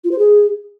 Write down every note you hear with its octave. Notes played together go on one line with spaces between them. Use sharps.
F4
C5
G#4